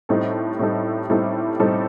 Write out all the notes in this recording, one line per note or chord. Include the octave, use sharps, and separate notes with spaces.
A2 G3 C4 D#4 A4
A2 G3 C4 D#4 A4
A2 G3 C4 D#4 A4
A2 G3 C4 D#4 A4